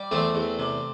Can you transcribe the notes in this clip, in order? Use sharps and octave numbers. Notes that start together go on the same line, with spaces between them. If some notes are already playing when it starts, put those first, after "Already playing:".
Already playing: G3
E2 A3 C4
E2
C3